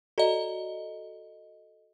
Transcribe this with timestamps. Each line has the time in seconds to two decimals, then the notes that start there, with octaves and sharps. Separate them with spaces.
0.18 F#4 A4 D5 D#5 A#5